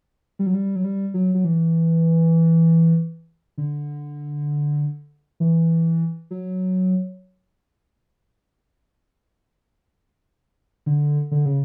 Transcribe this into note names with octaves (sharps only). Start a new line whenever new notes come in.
G3
F#3
G3
F#3
G3
F#3
F#3
E3
D3
E3
F#3
D3
D3
C#3